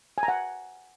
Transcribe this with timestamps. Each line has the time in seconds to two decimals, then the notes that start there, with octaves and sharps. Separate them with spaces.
0.18 G#5
0.23 A#5
0.28 F#5